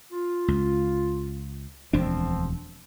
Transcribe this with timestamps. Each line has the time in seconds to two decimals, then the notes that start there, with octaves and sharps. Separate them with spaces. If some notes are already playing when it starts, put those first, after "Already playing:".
0.12 F4
0.48 C#2
1.93 E1 D2 F3 C4 D4